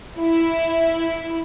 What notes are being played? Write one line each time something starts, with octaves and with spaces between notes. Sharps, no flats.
E4